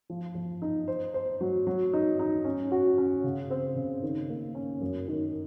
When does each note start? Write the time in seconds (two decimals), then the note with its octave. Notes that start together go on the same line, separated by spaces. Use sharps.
0.10 F3
0.35 F3
0.62 D#4
0.88 C5
1.14 C5
1.41 F#3
1.67 F#3
1.93 D#4
2.19 D#4
2.45 C#4
2.72 F#4
2.98 C#4
3.24 C#3
3.50 C4
3.76 C#3
4.03 D#3
4.29 A#3
4.55 C#4
4.81 F#2
5.08 D#3